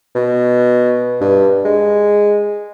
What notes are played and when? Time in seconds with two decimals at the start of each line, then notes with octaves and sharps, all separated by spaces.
0.15 B2
1.21 G2
1.65 G#3